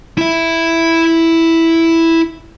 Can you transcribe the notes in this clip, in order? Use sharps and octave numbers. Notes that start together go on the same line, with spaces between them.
E4 E5